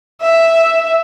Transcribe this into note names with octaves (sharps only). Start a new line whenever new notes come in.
E5